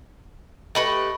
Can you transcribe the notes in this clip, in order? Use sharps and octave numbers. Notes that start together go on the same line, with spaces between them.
A3 G4 B4 D#5 B5 C#6